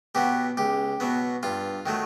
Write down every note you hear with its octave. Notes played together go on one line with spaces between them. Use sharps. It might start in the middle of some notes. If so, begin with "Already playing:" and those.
B2 F#3 B3 G4
C#2 G4
B2 F#3 B3
G2 F4
D#3 F#3 A3